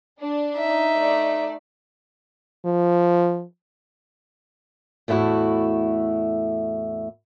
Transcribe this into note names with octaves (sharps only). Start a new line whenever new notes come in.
D4
D#4 E5
A3 D5
F3
E2 A2 A3 E4 F#4